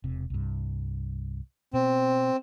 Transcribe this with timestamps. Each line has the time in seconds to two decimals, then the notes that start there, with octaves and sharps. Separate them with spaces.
0.04 E1 C3
0.30 C2 G2
1.73 B2 C4